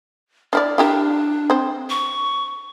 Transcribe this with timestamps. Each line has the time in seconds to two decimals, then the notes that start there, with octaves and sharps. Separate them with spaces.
0.53 D4 E4 D5 F6
0.78 D4 E4 G4 A#4
1.50 C4 C5
1.90 C#6